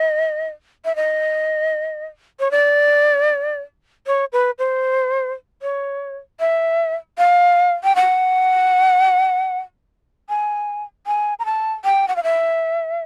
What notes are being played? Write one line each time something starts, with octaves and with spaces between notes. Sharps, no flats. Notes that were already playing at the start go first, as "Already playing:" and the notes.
Already playing: D#5
E5
D#5
C#5
D5
C#5
B4
C5
C#5
E5
F5
G5
F#5
G#5
G#5
A#5
A5
G5
F#5
F5
E5